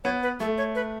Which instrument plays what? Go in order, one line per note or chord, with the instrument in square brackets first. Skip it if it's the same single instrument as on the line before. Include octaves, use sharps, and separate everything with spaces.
[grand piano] B3 [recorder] C#5
[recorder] B4
[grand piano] A3 [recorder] A4
[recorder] C#5
B4